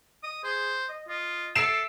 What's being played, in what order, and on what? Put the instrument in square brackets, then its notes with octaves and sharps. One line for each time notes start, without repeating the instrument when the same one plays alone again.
[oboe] D#5 [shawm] D#6
[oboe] G#4 [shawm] C5
[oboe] D#5
[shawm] F4 [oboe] D#5
[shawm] A4 [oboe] E5 [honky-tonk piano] C7 D7 E7